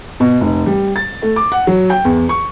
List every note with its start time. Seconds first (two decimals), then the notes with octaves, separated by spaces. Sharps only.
0.20 B2
0.41 F1
0.66 G3
0.96 A6
1.22 A3
1.36 D6
1.52 F#5
1.67 F#3
1.90 G5
2.05 E2
2.29 C#6